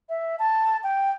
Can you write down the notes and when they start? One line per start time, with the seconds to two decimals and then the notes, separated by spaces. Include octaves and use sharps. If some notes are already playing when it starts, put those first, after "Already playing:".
0.09 E5
0.39 A5
0.84 G5